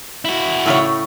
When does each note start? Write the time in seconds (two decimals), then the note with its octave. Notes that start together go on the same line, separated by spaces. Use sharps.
0.25 E4 F#4
0.66 A2 C#3 C#5